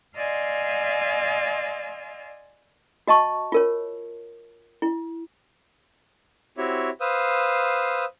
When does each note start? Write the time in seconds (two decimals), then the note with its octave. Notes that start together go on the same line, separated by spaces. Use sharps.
0.17 D5 D#5 F5 G#5 C6 E6
3.07 F#4 D#5 A5 C#6
3.52 F4 A#4 C#5
4.82 E4
6.58 C4 E4 F#4 G4 C#5 E5
7.01 B4 C5 F5 D#6 E6